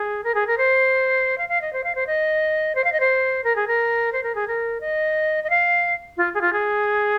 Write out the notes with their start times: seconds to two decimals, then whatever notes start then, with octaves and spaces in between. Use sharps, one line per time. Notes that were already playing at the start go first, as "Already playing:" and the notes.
Already playing: G#4
0.24 A#4
0.35 G#4
0.47 A#4
0.58 C5
1.38 F5
1.49 F5
1.62 D#5
1.73 C5
1.84 F5
1.95 C5
2.07 D#5
2.75 C5
2.84 F5
2.93 D#5
3.00 C5
3.44 A#4
3.56 G#4
3.68 A#4
4.13 C5
4.23 A#4
4.35 G#4
4.48 A#4
4.81 D#5
5.44 D#5
5.50 F5
6.17 F4
6.34 G#4
6.41 F4
6.53 G#4